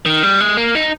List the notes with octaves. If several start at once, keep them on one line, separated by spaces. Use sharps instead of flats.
D#3
G3
G#3
A#3
D#4